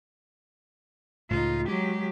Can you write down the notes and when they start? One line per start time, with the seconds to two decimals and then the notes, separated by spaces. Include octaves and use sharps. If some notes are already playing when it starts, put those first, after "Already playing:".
1.30 C#2 A2 D#4 F4
1.68 F#3 G#3 G4